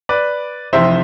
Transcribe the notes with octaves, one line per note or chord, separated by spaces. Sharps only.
B4 D5
F1 F2 C3 E3 C5 E5